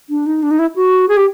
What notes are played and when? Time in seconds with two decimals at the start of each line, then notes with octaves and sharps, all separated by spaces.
0.10 D4
0.26 D#4
0.43 D4
0.51 D#4
0.59 E4
0.76 F#4
1.09 G#4
1.17 G4